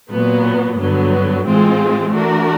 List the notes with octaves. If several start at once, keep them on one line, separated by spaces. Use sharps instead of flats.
A#2 F#3 B3
G2 D3 F#3 B3
A2 E3 G#3 C4 F4
E3 A3 D4 F#4 A#4